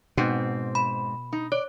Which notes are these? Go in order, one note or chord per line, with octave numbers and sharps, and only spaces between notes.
G#2 B2 C4
B5
D#4
C#5 D5